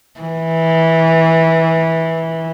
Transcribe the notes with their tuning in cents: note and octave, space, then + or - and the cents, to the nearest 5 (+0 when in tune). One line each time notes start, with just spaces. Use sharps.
E3 -15